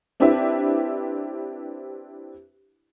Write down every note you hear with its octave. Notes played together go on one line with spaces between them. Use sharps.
C4 D4 E4 G4 B4 E5